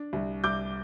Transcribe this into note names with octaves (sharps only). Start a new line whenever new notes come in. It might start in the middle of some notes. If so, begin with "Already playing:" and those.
Already playing: D4
C2
C2 D6 G6